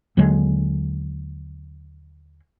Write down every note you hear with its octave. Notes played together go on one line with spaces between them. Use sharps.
D#2 D3 F#3 G#3